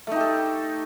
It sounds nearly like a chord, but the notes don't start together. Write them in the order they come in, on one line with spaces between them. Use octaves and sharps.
A3 D#4 G4 A4